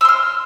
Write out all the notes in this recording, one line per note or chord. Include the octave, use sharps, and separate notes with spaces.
C6 E6 F6